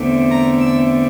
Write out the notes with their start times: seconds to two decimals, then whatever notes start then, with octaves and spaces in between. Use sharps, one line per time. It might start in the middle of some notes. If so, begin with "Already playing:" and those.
Already playing: E2 D3 A3 C4
0.30 A#5
0.60 E6